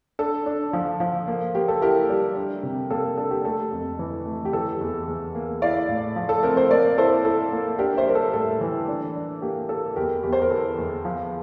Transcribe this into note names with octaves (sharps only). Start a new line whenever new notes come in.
D4 A4
D4
F3
F3
A#3
A#3 G4
A4
E4 G4 A#4
G3
D4
C3
A#3 A4
D4 A4
G4
A3 A4
F2
E3
A3
G4
E3 A4
E2
E2
A#3
E4 D5 F5
A2
F3
A4
C4 A#4
C5
A#3 A#4 D5
E4 A4 C5
E4 A4
A#3
D4 G4 A#4
C5 E5
G3 A#4
A4
A2 A4
E3
D4
D4
A#3 G4
A#3 A4
E2 G4 A#4
E2 G4
C5
A#4
E3 A4
E2
F3